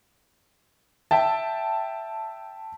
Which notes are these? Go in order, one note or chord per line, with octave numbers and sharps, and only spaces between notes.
E5 G5 A5